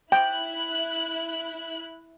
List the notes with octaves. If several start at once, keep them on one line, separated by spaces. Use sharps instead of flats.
E4 G5 F#6